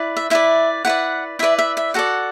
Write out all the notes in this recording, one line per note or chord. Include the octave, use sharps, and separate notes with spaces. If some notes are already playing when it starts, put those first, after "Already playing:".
Already playing: E4 B4 D5
E5
E4 B4 D5 E5
E4 B4 D5 F#5
E4 B4 D5 E5
E5
E5
F#4 A4 D5 F#5